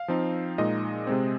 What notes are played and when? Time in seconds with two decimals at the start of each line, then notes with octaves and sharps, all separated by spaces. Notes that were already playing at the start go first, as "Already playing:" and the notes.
Already playing: F5
0.08 F3 C4 D#4
0.58 A#2 G#3 D#4 D#5
1.07 C3 G#3 C4